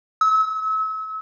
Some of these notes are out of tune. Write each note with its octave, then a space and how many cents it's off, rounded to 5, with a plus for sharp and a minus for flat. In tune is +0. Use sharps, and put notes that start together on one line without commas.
E6 -35